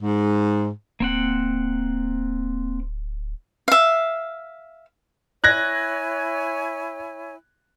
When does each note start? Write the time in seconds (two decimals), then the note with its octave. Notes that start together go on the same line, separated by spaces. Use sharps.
0.02 G#2
1.00 D1 A#3 C4 F#5
3.68 E5 F5
5.44 E4 C#5 G#5 F#6 G#6 A#6